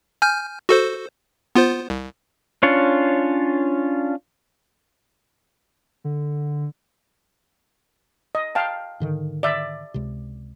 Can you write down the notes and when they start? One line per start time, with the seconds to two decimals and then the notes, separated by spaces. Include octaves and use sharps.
0.22 G#5 F6 G6
0.69 F#4 A4 C5
1.55 B3 F4 C5
1.90 C2
2.63 C#4 D4 F4 C#5
6.04 D3
8.35 D#5
8.55 F5 G5 A5
9.00 G#2 D3 D#3
9.43 D5 E5
9.94 C#2 C3